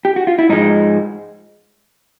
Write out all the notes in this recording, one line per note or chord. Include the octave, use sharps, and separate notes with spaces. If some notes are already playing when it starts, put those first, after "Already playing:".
G4
F#4
F4
E4
G#2 F3 G#3 D#4